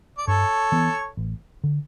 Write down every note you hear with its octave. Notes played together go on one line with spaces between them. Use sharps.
D5
G2 A4 C#5
E3 B3
A1
D3